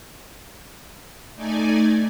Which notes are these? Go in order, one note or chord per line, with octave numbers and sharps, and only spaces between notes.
A3 D#4 D5 G#5